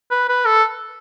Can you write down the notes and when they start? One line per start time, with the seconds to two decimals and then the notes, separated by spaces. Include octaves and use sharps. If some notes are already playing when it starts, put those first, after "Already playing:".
0.11 B4
0.29 B4
0.46 A4